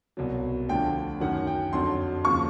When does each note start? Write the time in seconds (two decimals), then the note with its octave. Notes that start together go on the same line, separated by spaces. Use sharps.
0.17 C2 B2 F#3
0.69 D2 D3 F3 G5
1.20 F#2 D#3 F#3 F#5
1.47 G5
1.73 F2 D3 F#3 C6
2.24 D#2 C#3 F3 C#6